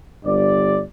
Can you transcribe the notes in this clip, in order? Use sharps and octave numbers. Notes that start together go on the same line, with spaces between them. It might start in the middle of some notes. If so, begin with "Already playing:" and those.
G1 G2 D5